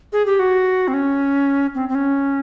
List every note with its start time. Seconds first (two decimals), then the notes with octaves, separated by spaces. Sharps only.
0.13 G#4
0.26 G4
0.39 F#4
0.88 C4
0.94 C#4
1.75 C4
1.89 C4
1.95 C#4